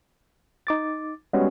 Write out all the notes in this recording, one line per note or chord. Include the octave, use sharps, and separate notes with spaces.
D#4 D6 A6
G3 G#3 B3 C#4 F#4 G#4